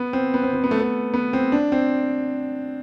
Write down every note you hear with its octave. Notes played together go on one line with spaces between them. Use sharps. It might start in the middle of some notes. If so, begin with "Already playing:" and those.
Already playing: B3
C4
B3
C4
C4
B3
A3
B3
B3
C4
D4
C4